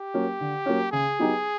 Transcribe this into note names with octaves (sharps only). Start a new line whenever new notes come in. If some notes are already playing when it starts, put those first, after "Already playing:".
Already playing: G4
F#3 A#3 C#4
D3
F#3 A#3 C#4
C#3 G#4
F#3 B3 D#4 G4